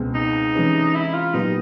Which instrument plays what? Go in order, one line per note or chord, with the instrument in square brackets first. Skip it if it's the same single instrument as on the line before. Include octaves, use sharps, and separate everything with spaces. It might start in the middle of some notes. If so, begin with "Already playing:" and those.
Already playing: [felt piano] C#2 B2 G#3 C4
[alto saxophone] D#4
[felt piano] C3 E3 G#3 C#4
[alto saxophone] E4
F4
[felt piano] A#2 F#3 B3 E4 G4 [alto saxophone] D#4